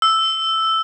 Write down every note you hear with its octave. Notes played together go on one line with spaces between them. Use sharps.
E6